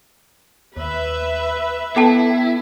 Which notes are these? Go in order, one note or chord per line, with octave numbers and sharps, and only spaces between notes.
D#2 B4 E5
B3 E4 A4 G5 A5